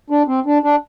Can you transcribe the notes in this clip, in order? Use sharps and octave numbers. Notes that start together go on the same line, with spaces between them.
D4
C4
D4
D4